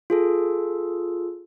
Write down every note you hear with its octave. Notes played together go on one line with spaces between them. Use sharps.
F4 G#4 A4